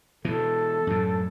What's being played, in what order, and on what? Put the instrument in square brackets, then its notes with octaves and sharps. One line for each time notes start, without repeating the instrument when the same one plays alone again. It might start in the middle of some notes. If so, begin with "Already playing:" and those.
[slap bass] B2 E3 [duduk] A4
[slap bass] F#2 A2